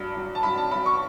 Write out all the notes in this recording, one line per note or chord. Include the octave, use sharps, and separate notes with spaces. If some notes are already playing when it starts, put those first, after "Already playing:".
Already playing: G2 F#3
G2 F#3
A5
G2 F#3 B5
A5
G2 F#3 B5
C#6